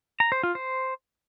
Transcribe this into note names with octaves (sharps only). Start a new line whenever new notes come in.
A#5
C5
F4
C5